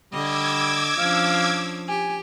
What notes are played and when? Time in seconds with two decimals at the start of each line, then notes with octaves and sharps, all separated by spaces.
0.13 D3 G3 D#5 D6 E6 G#6
0.98 F3 C#4 D4 F5
1.89 G4 G#5